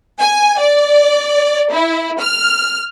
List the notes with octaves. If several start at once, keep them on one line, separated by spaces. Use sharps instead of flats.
G#5
D5
E4
F6